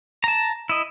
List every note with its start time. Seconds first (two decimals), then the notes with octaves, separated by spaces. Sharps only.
0.24 A5 A#5
0.69 E4 D#5